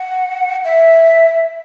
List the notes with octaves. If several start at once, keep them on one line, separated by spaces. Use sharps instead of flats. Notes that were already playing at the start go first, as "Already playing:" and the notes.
Already playing: F#5
E5